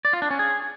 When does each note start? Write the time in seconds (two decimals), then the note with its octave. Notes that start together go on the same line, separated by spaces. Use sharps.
0.05 D5
0.13 F4
0.22 D4
0.31 C#4
0.39 G#4